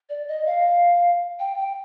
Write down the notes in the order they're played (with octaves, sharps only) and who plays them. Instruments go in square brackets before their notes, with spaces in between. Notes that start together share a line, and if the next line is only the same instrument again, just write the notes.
[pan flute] D5
D#5
F5
G5
G5